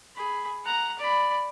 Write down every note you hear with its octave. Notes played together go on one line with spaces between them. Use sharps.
G#4 B5
F#5 A#5
D5 B5